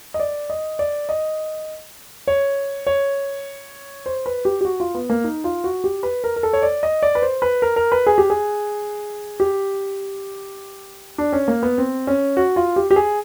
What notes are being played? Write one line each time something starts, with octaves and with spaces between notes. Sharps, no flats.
D#5
D5
D#5
D5
D#5
C#5
C#5
C5
B4
G4
G4
F#4
F4
B3
A#3
D#4
F4
F#4
G4
B4
A#4
A#4
A4
C#5
D5
D#5
D5
B4
C5
B4
A#4
A#4
B4
G#4
G4
G#4
G4
D4
C#4
A#3
B3
C4
C#4
F#4
F4
G4
G4
G#4